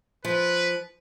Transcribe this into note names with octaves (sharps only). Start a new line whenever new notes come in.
F3 B4